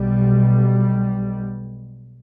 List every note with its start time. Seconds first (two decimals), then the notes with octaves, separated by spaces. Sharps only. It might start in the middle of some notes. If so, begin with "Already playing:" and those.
Already playing: B1 B2 G3